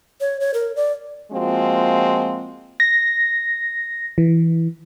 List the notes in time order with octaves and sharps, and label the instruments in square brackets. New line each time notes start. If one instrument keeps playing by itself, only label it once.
[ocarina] C#5
C#5
A#4
D5
[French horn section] F3 G#3 A#3 C4 F4 F#4
[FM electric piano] A#6
E3